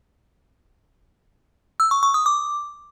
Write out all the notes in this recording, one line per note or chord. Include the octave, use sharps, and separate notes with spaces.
E6
C#6
C#6
D#6
D6